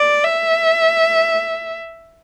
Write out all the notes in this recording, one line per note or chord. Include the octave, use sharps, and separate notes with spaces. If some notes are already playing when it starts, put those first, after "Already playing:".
Already playing: D5
E5